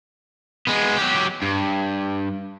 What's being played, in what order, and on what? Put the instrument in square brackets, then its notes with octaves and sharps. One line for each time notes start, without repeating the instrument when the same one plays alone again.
[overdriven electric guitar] G#3 B3
F#3 G4
G2